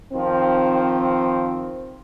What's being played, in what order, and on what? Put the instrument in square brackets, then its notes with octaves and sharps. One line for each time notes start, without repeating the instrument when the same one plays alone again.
[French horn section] D#3 F3 C4